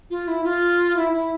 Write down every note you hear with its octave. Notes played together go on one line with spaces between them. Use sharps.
F4
E4
F4
E4
E4